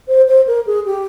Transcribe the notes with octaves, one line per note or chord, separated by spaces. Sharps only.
C5
C5
A#4
G#4
G4